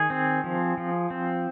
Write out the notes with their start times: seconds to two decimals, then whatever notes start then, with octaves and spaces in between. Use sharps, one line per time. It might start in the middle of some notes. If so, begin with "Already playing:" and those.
Already playing: D#3 G#4
0.10 C4
0.44 F3
0.78 F3
1.10 C4